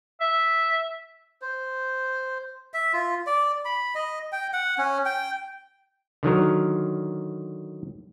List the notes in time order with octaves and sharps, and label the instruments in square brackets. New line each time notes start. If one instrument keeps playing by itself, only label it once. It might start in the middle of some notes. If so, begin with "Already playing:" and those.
[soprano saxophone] E5
[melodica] C5
E5
F4
D5
B5
D#5
G5
F#5
C#4
G5
[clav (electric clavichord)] D3 D#3 F#3 A#4